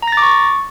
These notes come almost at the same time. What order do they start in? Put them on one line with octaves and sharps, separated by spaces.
A#5 A#6 A6 D6 C#6